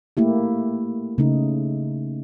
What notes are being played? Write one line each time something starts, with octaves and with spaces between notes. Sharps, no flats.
A3 A#3 E4 G4
C#3 A3 D#4